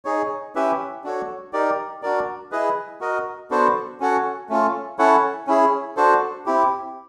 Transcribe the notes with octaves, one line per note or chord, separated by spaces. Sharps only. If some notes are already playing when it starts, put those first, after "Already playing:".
D#4 G#4 C#5
C#4 E4 G4 B4 E5
D4 F#4 A4 C#5
D#4 G4 A#4 D5
D4 F#4 A#4 D5
E4 G#4 B4 D#5
F#4 A#4 D#5
B3 D4 F#4 A4 C5
C#4 F#4 A4 C#5 F#5
A3 C#4 F4 A4
C#4 E4 A4 C#5 F#5
C#4 E4 G#4
D4 F#4 A4 C5
C4 E4 G4